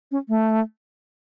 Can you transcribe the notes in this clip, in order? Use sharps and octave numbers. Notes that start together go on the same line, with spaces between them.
C#4
A3